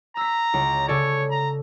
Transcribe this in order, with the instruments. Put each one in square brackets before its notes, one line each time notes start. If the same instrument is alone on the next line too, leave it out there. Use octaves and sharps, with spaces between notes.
[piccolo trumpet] A#5 [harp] E6 B6
[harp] C#2
[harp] C#3 A4 D5 [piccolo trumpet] C#5
[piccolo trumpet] A#5